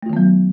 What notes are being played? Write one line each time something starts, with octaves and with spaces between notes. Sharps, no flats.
D#3 F#3 A3 B3 F4